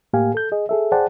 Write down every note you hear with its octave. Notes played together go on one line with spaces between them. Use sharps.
A2 A#3 G4 F5 G#5
A4 G6
G#4 D#5
G#4 A4 E5
G#4 C5 D5 F#5 G5 A5